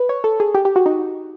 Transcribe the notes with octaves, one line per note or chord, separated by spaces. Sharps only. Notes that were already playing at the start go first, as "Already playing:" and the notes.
Already playing: B4
C#5
A4
G#4
G4
G4
F#4
D#4